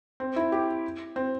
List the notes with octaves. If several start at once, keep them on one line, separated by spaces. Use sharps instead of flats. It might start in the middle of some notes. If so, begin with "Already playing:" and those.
C4
E4
G4
C4